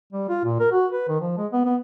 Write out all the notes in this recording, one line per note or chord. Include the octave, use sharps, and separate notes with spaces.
G3
F4
A#2
A#4
F#4
B4
D#3
F3
G#3
B3
B3